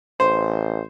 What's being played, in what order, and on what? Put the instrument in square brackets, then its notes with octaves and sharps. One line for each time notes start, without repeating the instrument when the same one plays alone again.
[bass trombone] A1 [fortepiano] C5